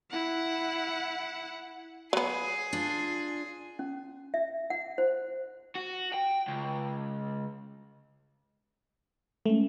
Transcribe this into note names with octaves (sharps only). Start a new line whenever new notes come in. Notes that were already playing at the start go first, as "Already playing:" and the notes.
E4 F#5
F#3 B3 G#4
D4 F4
C#4
E5
F#5
C5
F#4
G5
C#2
G#3 A3 C#4